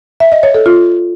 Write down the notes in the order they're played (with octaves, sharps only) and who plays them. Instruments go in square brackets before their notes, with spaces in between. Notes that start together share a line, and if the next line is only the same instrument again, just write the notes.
[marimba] E5
D#5
C#5
A4
F4